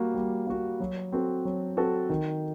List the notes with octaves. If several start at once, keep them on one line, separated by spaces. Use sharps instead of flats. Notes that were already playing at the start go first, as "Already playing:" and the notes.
Already playing: G3 A#3 F#4
G3
A#3 F#4
F#3
C4 F#4 A4
F#3
C4 F#4 A4
D#3